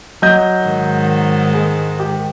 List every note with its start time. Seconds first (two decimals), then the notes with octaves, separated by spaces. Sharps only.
0.22 F#3 D#5 G6
0.65 G#2 D#3
1.54 G#3
1.99 G4